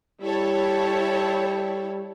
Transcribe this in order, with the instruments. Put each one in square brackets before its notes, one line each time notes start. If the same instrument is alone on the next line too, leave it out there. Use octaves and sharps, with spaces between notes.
[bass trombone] G3 [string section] E4 A4 C#5